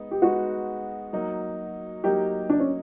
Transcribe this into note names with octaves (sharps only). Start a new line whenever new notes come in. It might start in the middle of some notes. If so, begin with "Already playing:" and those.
Already playing: G#3 B3 D#4
G4
G#3 B3 D#4 F#4
F#3 A#3 D#4
F#3 A#3 D#4 G4
D4
C#4